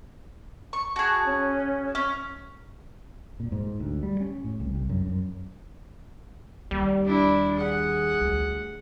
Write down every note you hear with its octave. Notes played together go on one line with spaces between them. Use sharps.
C#6
F#4 G#4 A5
C#4
C#4
A#2
G#2
D2
G3
C#4
A2
C2
C2
F#2
F#2
D#2 G3
D4 E4
G#4 F#5
D2